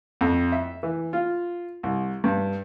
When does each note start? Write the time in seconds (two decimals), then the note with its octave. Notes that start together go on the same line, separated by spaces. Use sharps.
0.21 F2
0.52 E5
0.83 E3
1.13 F4
1.83 C2
2.24 G2